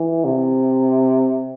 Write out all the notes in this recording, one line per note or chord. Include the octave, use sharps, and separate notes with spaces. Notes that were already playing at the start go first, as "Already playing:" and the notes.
Already playing: E3
C3